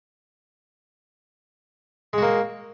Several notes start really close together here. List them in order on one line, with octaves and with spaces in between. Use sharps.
G#3 F#4 A#3